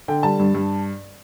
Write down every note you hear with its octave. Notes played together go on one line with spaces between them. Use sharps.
D3 G5
G3 A5
G2
G2